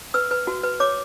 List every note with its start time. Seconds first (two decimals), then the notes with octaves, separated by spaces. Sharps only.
0.14 B4 E6
0.31 B4
0.47 F#4
0.63 B4
0.80 C#5 D6